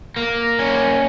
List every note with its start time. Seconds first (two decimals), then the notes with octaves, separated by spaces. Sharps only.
0.16 A#3
0.59 C#4